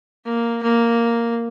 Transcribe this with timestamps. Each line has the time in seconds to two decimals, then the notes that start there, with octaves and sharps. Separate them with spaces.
0.25 A#3
0.62 A#3